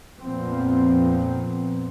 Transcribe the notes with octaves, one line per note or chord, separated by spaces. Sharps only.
F2 A#2 F3 B3 C4